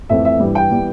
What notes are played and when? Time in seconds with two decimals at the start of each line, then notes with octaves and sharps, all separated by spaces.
0.09 F2 E3 A3 C4 E5
0.25 E5
0.40 G2 E3 G3
0.55 G5
0.72 E3 G3 B3